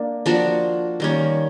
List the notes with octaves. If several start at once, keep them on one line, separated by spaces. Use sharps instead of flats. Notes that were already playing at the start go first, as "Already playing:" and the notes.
Already playing: A#3 D4
F3 A#3 D4 F#4
D#3 G3 A#3 C#4